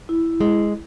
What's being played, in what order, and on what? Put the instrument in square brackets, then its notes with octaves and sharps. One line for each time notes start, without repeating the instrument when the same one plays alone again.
[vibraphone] E4
[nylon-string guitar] G#3